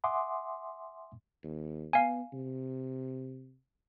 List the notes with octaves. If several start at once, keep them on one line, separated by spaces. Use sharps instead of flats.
E5 F#5 G#5 C6 D6 D#6
D#2
B3 F5 G#5
C3